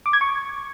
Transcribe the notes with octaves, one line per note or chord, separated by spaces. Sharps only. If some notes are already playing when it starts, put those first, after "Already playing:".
D6
G#6
C#6